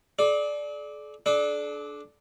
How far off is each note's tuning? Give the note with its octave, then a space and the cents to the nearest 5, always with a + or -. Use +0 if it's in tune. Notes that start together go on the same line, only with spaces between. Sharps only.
A4 -45 D5 +0
D4 +0 A4 -40